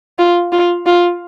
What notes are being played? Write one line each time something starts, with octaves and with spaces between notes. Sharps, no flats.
F4
F4
F4